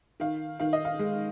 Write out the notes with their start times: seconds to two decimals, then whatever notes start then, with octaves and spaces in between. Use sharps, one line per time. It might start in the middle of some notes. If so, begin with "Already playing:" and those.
0.20 D#3 F5
0.60 D#3 F5
0.73 D#5
0.85 F5
0.99 G#3